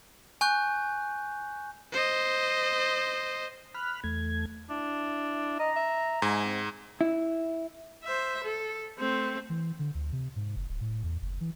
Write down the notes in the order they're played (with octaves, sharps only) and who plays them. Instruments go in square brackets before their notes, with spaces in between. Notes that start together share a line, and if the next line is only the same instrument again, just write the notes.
[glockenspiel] G#5 C#6 F#6 G6
[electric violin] C5 D#5
[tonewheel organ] B5 F6 F#6
E2 A3 G#6
[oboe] D4 [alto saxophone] E4
[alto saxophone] D#5 [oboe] A#5
[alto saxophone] E5
[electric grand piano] G#2 [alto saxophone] G#5
[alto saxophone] C4
[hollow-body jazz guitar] E4
[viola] C5 E5
A4
A3 C4
[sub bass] E3
D3
D2
C3
G#2
F#1
D1
A2
E2
F#1
E3